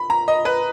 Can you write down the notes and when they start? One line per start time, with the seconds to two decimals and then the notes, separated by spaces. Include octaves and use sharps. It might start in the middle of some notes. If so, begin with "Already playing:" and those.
Already playing: B5
0.10 A#5
0.28 D#5
0.45 B4